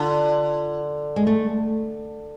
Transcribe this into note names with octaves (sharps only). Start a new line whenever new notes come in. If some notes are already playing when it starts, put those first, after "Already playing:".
Already playing: D3 F4
G#3
A3